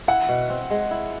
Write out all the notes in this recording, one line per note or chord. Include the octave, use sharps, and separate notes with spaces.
E4 F#5
B2
C4
G#3
E4